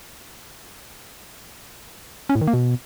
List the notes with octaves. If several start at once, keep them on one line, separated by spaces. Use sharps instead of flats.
C#4
A2
D#3
A#3
B2